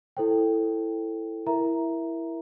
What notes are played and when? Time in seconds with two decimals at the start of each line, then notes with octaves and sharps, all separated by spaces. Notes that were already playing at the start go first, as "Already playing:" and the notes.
0.17 E4 A4 C5 G5
1.47 E4 A#4 E5 A#5